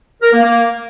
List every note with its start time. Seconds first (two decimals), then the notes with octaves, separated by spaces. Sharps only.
0.22 A#4
0.33 A#3
0.43 A#3